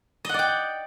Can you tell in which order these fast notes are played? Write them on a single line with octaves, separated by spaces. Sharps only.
D#5 F#5 D5 G5